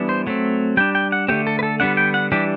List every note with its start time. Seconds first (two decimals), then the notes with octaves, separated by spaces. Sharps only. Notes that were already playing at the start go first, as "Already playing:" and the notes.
Already playing: E3 G3 B3 D4
0.09 C5
0.27 F#3 A3 C4
0.77 G3 D4 G5
0.95 G5
1.12 F#5
1.28 D3 A3 C4 G4
1.47 A4
1.59 B4
1.63 A4
1.80 D3 G3 B3 D4 F#5
1.97 G5
2.14 F#5
2.32 E3 G3 D4 G4